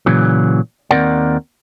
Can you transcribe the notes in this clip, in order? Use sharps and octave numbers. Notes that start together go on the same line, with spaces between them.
A#2 C#3 E3 F#3
D#2 E3 C4 A#4 D5 F#5